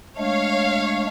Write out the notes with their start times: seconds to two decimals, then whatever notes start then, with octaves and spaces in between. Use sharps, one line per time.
0.18 G#3 A3 D4 C#5 F5